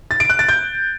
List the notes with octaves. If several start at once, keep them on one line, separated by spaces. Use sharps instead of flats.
A6
D7
F#6
A6
G6